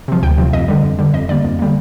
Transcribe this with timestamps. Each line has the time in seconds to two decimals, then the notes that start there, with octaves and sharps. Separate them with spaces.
0.08 C3 F3
0.23 D2 G5
0.38 C3 F3
0.53 F2 D#5
0.68 D3 G3
0.84 F2
0.99 D3 G3
1.14 F2 D#5
1.29 D3 G3 A#3 D5
1.44 F2
1.59 D3 G3 A#3